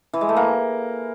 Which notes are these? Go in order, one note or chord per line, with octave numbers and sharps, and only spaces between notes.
E3
G#3
A3
A#3